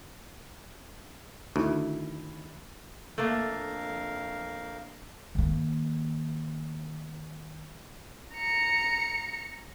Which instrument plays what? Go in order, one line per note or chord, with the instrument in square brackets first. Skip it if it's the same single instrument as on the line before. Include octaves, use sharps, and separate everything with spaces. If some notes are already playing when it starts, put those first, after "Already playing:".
[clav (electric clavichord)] D2 [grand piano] D#3 D#4 E4
[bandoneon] F2 A#4 F5 [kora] A3 A#3 D4
[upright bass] D#3 A#3
[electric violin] A#5 C#7